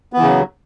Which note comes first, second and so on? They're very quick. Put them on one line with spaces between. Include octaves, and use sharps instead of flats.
B3 E3 C#3 F#3